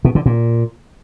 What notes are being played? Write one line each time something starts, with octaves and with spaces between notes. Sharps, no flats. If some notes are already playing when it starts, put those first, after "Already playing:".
B2
D3
A#2